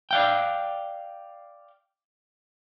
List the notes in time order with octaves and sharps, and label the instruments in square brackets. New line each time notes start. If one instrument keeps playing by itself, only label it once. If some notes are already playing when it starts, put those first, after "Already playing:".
[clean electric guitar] D5 F5 G5